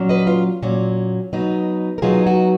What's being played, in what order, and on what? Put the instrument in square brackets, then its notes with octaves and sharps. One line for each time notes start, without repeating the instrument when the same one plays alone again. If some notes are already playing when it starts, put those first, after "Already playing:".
Already playing: [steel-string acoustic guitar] A#2 F#3 C#4
B4 D#5
F4
A#2 F#3 C#4
B2 F#3 B3 D#4
A#4
B2 F#3 B3 D#4 F4 G#4
F#4